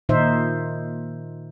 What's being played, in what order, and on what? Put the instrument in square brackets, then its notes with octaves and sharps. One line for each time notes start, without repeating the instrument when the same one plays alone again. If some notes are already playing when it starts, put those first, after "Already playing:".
[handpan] A#2 D#3 D#4 C5 E5